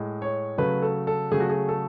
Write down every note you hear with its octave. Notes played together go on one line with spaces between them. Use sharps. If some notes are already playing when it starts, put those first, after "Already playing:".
Already playing: A2 G#3
C#5
C#3 F#3 A3 B4
A4
A4
C#3 F#3 A3 G#4
F#4
G#4
A4